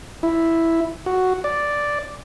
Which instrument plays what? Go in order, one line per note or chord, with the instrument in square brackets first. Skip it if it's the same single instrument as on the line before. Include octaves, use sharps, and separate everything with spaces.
[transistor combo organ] E4
F#4
D5